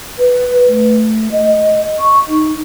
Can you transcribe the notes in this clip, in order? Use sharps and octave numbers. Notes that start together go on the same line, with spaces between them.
B4
A3
D#5
C#6
D#4